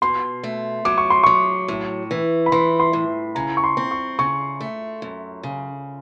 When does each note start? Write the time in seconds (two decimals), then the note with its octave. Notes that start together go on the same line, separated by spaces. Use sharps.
0.02 B2 C6
0.43 A3
0.85 F#3 D6
0.98 C#6
1.10 C6
1.23 F#3 C#6
1.68 A2
2.11 E3
2.46 B5
2.52 E3 C6
2.80 C6
2.93 A2
3.35 C#3 A#5
3.57 C#6
3.64 C6
3.77 C4
3.91 C#6
4.19 C#3 C#6
4.60 A3
5.02 F#2
5.43 C#3